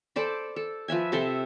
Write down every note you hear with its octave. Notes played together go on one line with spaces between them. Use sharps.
A4 C5 D5 B5
A4
F3 B4 E5 G#5
C3 A4 E5 C6